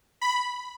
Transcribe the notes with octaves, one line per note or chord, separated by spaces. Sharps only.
B5